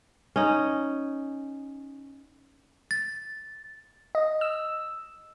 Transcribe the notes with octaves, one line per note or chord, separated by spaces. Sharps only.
C#4 D#4
A6
D#5
E6